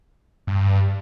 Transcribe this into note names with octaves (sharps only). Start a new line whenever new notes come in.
G2